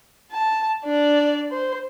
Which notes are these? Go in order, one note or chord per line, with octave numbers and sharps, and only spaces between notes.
A5
D4 D5
C5